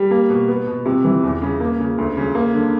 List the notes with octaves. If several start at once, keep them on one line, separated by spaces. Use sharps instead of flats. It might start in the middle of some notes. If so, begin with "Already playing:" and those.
Already playing: G3
A#3
B2
B3
B2
C3
E3
E2
C#3
A#3
C#3
D2
C#3
A#3
D3